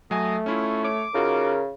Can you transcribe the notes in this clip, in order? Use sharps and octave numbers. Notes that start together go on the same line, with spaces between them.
F#3 A3 D#5 G#5
C#4 E4 F4 C#5
C#5 D6
C#3 D#4 F4 F#4 A#4